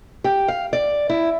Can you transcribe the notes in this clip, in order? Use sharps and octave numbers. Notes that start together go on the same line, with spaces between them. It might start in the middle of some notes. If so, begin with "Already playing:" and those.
G4
F5
D5
E4